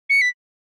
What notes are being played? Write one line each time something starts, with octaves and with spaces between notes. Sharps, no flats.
C#7
B6